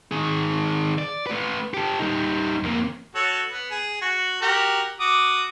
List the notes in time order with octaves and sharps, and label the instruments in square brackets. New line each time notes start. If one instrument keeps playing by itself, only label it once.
[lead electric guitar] D#3 G#4
D5
A3 B4
G4 A4
G3 D#4
F2 A#3
[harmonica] F#4 A4 C#5
B3
G#4
F#4
F#4 G4 A#4
F#4 D6 D#6